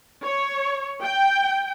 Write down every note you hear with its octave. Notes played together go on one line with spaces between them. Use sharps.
C#5
G5